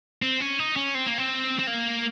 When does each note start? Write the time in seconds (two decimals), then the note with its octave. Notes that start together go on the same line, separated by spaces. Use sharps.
0.22 C4
0.40 C#4
0.59 D#4
0.76 C#4
0.95 C4
1.06 A#3
1.18 C4
1.59 C4
1.67 A#3